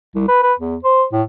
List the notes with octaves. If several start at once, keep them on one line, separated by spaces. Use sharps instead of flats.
C2
B4
B4
E2
C5
A2